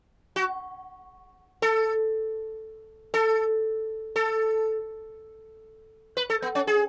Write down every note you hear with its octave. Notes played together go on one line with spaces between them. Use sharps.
F#4
A4
A4
A4
B4
A4
B3
C#4
G#4